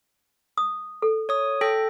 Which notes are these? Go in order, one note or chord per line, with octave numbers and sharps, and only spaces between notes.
D#6
A4
C#5 D#6
A4 G5 A#6